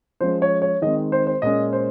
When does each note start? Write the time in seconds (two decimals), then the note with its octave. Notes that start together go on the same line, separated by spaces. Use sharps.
0.21 F3 G#3 C#4 C5
0.42 C#5
0.62 C#5
0.82 D#3 G#3 C4 D#5
1.12 C5
1.27 C5
1.42 A#2 G#3 C#4 D#5
1.73 C5